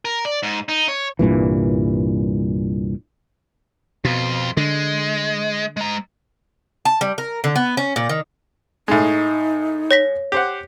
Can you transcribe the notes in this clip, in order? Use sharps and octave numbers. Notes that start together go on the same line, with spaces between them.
A#4
D5
G#2
D#4
C#5
C2 G2 A#2 E3
F2 B2 F4
D3 G#3
G#3 A#5
A5
G3
A#4
D3
B3
C#4
A#2
D#3
A2 G#3 D#4
C#5 A#6 B6
G4 C5 F#5